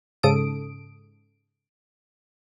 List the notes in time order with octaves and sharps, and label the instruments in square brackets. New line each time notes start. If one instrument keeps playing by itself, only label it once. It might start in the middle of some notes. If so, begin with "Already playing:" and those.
[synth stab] G#2 C#3 A4 D#6 D7